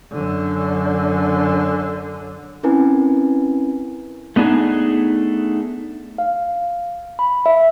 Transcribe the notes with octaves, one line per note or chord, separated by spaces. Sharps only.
F#2 D3
C4 C#4 E4 A#4 B4 G#5
A3 B3 D4 D#4 G#4
F5
B5
E5